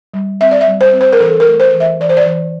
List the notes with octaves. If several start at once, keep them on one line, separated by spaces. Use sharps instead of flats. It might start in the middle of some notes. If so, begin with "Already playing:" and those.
G3
C4 E5
D5
E5
G3
C5
C4
C5
A#4
E3 A4
A#4
A3
C5
E3
E5
E3 D5
C5
D5
E3